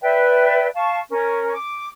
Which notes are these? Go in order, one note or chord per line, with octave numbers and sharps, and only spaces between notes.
B4 D5 E5 G5
F5 A5 C#6
C#4 A#4
D6